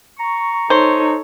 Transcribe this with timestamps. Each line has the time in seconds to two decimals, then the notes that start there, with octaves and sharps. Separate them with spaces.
0.19 A#5 C#6
0.70 D#4 A4 C5 C#5